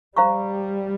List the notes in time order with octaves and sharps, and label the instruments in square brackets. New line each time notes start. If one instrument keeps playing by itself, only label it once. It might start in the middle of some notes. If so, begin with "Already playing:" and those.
[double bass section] G3 [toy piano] C5 F5 A#5 C#6